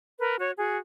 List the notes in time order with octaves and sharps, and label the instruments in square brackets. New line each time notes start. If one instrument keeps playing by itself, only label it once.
[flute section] A#4 B4
F#4 C#5
F#4 G#4